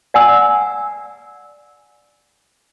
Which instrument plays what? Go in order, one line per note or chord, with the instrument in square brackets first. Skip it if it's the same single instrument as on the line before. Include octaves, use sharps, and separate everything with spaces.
[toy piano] D5 F#5 G#5 E6